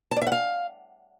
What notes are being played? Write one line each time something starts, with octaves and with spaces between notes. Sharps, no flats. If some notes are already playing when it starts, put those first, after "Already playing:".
A5
D5
E5
F#5
F5